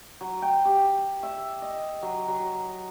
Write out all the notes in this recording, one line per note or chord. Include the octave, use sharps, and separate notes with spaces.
F#3
G5
G4
E5
D#5
F#3
F#3